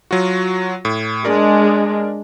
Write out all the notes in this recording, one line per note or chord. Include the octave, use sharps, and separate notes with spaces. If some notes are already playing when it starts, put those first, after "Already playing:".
F#3 F4 F#4
A2
G#3 D4 A#4 D5